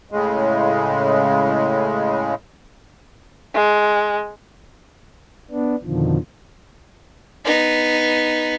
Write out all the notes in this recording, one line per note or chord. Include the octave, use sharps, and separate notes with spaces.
A2 C#3 G#3
G#3
B3 D4
F2 B2 D3 D#3 F3
B3 D#4